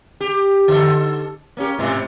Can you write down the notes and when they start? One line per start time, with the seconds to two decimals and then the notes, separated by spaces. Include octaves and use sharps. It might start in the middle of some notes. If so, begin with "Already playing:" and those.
0.20 G4
0.68 D3 A4
1.57 A#3 C#4 G4
1.79 G#2 C3